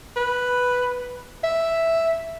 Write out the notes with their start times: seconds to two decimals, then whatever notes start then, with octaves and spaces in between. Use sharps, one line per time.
0.16 B4
1.44 E5